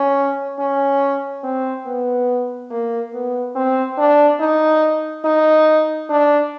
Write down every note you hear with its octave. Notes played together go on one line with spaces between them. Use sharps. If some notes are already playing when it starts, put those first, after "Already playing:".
Already playing: C#4
C#4
C4
B3
A#3
B3
C4
D4
D#4
D#4
D4